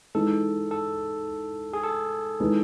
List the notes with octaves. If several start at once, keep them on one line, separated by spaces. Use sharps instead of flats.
E3 G#3 D#4 A4
A4
G#4
A4
E3 G#3 B3 D#4